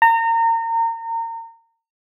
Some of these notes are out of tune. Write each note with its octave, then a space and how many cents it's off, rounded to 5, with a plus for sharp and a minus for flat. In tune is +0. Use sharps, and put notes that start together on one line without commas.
A#5 -30